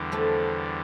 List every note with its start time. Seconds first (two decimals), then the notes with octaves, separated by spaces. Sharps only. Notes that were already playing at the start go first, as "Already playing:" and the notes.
Already playing: E2 D3 G3
0.12 F3 A3